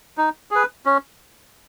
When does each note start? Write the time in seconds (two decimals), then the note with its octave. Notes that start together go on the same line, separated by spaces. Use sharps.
0.17 D#4
0.51 G#4 B4
0.86 C#4